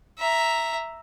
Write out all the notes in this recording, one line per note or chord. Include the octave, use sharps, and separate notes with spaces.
E5 A#5